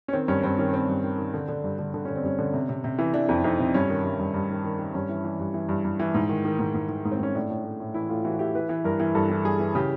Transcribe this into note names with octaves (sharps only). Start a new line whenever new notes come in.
C#4
D#3 C4
G2 C#4
G2 C4
D#3 C#4
D#3 C4
G2
D#3
D#3
D3
D3
G2
D3
D3 D4
D3 C#4
C4
G2 C#4
D3
C3
C3
C3
E3
E3 D4
F2
F2 D#4
C3
G2 C#4
D#3
G2
G2
G2
D#3
D#3
D#3
G2 C#4
E3
E3
G2
E3
G2
G2
E3
G#2
D#3
D#3
G#2
G#2
D#3
G#2
C4
G#2 C#4
A2 D4
A2
A2
A2
E3 E4
A2 F4
E3 F#4
E3 G4
E3 B4
E3
G2 A#4
E3
G2 A4
E3
G2 G#4
E3
C#3 G4